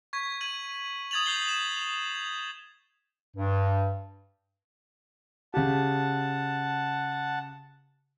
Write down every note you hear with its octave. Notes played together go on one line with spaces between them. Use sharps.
C#6 G#6 B6
G#6 D#7 F#7
D#6 G#6 A6 F7 F#7
G6 C7 G7
E7 F7
G#6
G2
C#3 G4 F#5 A5